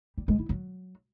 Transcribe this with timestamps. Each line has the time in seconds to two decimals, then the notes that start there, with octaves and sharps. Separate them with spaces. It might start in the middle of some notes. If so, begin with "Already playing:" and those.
0.18 G3
0.28 G#3
0.39 E4
0.49 F#3